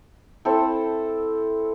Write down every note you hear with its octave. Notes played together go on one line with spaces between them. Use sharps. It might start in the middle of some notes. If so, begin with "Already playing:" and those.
C4 E4 A4